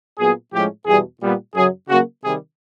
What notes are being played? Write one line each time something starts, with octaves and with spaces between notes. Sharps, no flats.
A#2 F#3 B3 G#4
A2 F3 G#3 C#4 G4
E2 B2 G3 G#4
A#2 G3 B3
F#2 C#3 F#3 G#4
C#3 F#3 A#3 F#4
C3 D#3 G3 G#4